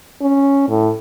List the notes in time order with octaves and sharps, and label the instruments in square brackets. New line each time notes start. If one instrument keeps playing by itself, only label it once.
[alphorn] C#4
A2